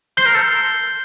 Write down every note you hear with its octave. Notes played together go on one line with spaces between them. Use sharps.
C5 G6 C7 G7
A#4
A4